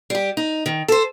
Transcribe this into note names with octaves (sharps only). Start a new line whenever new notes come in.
G3 G4
D#4
D#3
A4 C5